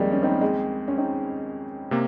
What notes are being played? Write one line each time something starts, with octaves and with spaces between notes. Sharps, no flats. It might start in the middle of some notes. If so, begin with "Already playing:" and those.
Already playing: D#2 D#3 F3 G3 G#3 A#3 C4
C#4
C4 D#4
G#3 C4
C#4
C4 D#4
C3 A#3